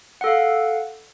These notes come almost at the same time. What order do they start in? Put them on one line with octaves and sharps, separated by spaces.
F#5 A4 F5